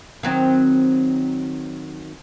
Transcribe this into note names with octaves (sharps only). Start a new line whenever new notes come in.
D#3 F#3 C4